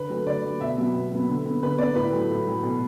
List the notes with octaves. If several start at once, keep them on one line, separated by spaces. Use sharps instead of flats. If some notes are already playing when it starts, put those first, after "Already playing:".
Already playing: D3 B4
F#3 A3
D3 D5
F#3 A3
B2 E5
F#3 B3
B2
F#3 B3
D3
B3
D3 B4
B3 D5
A2 B4
F#3 A3
A2
F#3 A3
B2